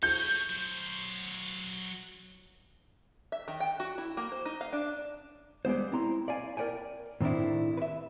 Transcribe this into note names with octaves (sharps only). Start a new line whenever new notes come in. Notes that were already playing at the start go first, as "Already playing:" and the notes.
A4 C#5 G6
F#3 C5
E5
D#3
G5
F#4
E4
A#3
C5
D#4
F5
D4
G3 G#3 B3 C5
C4 E4 A#5 C6
D5 F5 G#5
A#4 B4 D5 G5 G#5
A2 D#3 C4 D4 E4
B4 E5